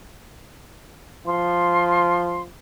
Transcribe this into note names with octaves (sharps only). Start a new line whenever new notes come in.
F3 C6